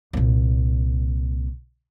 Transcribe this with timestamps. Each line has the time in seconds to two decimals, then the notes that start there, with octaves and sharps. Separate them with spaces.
0.13 C2 A#2